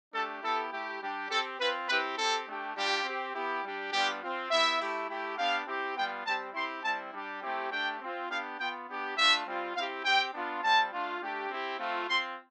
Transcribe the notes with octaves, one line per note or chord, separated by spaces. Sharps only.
A3 D4 G4 A4
B3 E4 G4 A4
A3 E4 G4
G3 D4 G4
C4 G4 A4
C4 F4 B4
C4 E4 G4 B4
C4 G4 A4
A3 D4 G4
G3 D4 F4 G4
C4 G4
B3 E4 G4
G3 D4 G4
G3 B3 D4 F4 G4
C4 F4
B3 E4 G4 E5
A3 E4 G4
A3 E4 G4
B3 D4 G4 F5
C4 E4 G4
G3 B3 F4 G5
G3 C4 G4 A5
C4 E4 G4 C6
G3 C4 E4 A5
G3 D4 G4
A3 C4 E4 G4
A3 D4 G4 G5
C4 F4
B3 D4 G4 F5
B3 F4 G5
B3 D4 G4
A3 D4 F4 E5
G3 C4 F4
C4 E4 G4 F5
C4 G4 G5
B3 D4 F4
G3 C4 F4 A5
A3 D4 F4
A3 D4 G4
C4 E4 G4
A3 C4 F4
C4 F4 C6